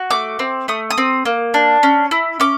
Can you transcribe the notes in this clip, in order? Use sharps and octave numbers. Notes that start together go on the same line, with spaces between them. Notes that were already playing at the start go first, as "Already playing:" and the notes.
Already playing: F#4
A3 D6
C4
A3 D#6
D#6
C4
A#3
D4
C#4
E4
C#4 D6